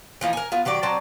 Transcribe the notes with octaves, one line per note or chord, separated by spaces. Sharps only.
E3 F3 A#3 D#4
A#4 G#5
B3 F4
D#3 F#3 G4 D5
F#3 C4 D5 A5